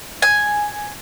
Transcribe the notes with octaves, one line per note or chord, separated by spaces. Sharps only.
G#5